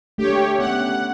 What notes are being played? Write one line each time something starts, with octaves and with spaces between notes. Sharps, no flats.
A3 D4 G4 C#5
B3 C#4 F#5